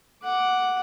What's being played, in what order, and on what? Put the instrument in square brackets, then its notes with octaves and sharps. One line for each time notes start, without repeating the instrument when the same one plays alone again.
[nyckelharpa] F#5 D6